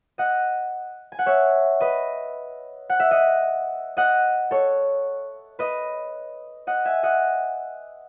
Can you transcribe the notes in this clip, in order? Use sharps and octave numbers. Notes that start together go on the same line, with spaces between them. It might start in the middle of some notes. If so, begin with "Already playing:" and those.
D#5 F#5
G#5
F#5
C#5 E5
B4 D#5
F#5
E5
D#5 F#5
D#5 F#5
A4 C#5
B4 D#5
D#5 F#5
E5 G#5
D#5 F#5